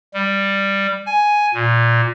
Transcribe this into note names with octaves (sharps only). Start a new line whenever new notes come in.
G3
G#5
A#2